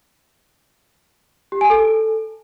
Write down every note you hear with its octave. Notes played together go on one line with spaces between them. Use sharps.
G4
G#5
A4